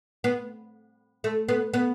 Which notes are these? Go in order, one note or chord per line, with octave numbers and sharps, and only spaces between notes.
B3
A3
B3
B3